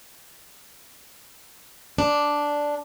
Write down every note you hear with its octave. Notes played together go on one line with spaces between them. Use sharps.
D4